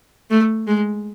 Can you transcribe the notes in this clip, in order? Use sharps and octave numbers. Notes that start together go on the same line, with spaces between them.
A3
G#3